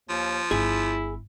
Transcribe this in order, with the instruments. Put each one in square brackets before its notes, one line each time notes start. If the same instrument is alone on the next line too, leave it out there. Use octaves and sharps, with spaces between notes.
[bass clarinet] D#2 [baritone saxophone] F3
[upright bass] G1 [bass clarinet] E4 [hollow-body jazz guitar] G#4